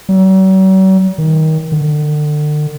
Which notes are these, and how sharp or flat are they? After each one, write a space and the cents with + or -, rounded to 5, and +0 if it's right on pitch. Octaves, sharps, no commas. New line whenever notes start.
F#3 +45
D#3 +20
D3 +35